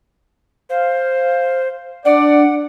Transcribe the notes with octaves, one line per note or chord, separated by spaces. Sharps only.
C5 F5
D4 D5 F#5